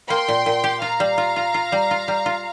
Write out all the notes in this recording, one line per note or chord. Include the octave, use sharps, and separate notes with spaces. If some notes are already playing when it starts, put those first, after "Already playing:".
A#3 G5 C6
A#2
A#2
G4
F4 F5 A#5
G3
F4
F4
F4
G3
F4
G3
F4